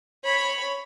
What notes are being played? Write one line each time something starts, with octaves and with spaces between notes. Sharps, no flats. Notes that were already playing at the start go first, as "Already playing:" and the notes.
C#5 B5